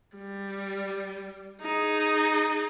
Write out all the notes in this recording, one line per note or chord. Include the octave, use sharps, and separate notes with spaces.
G3
D#4 G#4